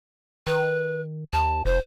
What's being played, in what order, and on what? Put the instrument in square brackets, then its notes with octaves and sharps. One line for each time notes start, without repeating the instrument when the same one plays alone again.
[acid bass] D#3 [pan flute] B4
[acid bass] D#2 [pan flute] A5
[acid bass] F1 [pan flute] C5